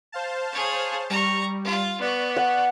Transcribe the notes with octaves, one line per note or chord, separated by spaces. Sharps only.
C5 F5 A5
G#4 C#5
G3 A#5 C#6
F4
B3 D5 C#6 F#6
F#5